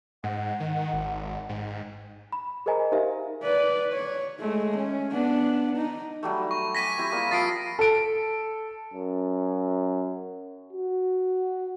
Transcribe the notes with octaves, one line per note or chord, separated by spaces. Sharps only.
G#2 F#5
D#3
G#1
G#2 G5
B5
G#4 A#4 C5 D#5 G#5 A#5
D#4 G4 A#4 C5 E5 F5
B4 D5
C#5
G#3 A3
C#4
B3 D4
D#4
F#3 G3 A3
C#6
G#5 D6 A#6 B6 D#7
C4 E4 G4
G3 A#3 G#4
F3 B5 E6 A6 C7 D7
A4 D7
F#2
F#4